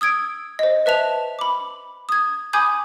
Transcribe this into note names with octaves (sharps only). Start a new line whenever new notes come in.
D#6 E6 G#6 D7
C5 D#5
B4 E5 A5 F7
B5 D6
D#6 G#6
G#5 B5 D6 D#6 G6 G#6